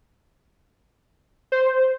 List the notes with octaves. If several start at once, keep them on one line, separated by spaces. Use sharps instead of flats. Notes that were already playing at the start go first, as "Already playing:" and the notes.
C5